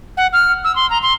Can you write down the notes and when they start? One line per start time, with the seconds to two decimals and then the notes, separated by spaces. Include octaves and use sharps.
0.17 F#5
0.33 F6
0.64 E6
0.76 C6
0.90 A#5
1.02 C6